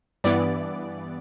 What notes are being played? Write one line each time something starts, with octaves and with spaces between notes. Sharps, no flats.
G2 E3 B3 D5